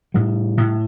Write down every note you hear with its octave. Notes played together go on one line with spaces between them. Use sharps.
A2 G3
A2